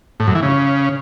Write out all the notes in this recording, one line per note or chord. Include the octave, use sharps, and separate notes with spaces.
A2
F#2
E3
C#3